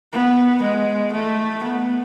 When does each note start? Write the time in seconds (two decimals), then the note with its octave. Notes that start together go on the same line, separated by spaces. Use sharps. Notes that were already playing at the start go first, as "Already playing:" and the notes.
0.13 B3
0.63 G#3
1.13 A3
1.63 B3